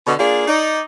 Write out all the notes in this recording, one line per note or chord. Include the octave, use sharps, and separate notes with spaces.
B2 D3
A#3 D4 F4 G#4
D#4 D5